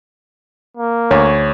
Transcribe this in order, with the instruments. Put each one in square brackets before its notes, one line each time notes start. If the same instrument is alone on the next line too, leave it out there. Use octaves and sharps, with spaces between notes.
[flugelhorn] A#3
[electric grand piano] D2 [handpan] C#5